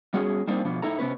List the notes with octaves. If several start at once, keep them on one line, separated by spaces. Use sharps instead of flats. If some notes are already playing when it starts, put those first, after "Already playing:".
G3 B3 C#4 F#4 G#4
G3 A#3 C4 D4 D#4
B2 F3 B3 D4
A2 A3 D#4 E4 A4 A#5
C3 B3 C#4 B4